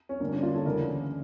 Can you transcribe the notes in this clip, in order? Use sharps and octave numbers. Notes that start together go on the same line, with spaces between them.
C#4
G2 D3 A#3 D4
A#3 D4
D4 F4
A4 C#5
D2 C#3 E3 A#4 D5